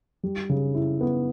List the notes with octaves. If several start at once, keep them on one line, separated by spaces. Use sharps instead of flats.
G3
C#3
E4
B3